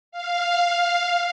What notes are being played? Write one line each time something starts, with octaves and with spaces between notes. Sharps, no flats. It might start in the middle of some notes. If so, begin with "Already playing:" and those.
F5